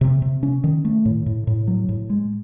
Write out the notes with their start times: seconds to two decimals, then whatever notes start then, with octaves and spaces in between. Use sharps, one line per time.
0.01 C3
0.22 C3
0.43 C#4
0.64 D#3
0.85 A3
1.05 A2
1.26 A2
1.47 A2
1.68 F#3
1.89 A2
2.10 G#3